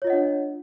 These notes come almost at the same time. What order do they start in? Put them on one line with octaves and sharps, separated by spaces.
C#5 F4 D#5 F#5 D4